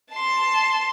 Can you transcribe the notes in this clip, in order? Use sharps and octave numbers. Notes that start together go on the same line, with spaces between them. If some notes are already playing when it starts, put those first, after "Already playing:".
A5 C6